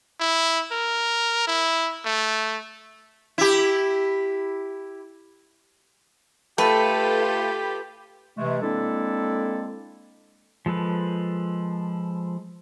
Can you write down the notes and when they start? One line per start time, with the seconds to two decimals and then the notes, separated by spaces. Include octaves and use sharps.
0.20 E4
0.71 A#4
1.47 E4
2.05 A3
3.38 E4 G4
6.58 A3 F4 G4 A4 B4 B5
8.37 C3 E3 G#3 A3
8.62 G#3 A#3 C4 D4 E4 A4
10.66 F3 G#3 A4 B4